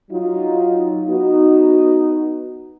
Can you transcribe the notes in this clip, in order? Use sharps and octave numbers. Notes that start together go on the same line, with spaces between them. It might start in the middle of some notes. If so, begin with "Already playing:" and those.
F#3 D#4 F4
B3 D#4 F#4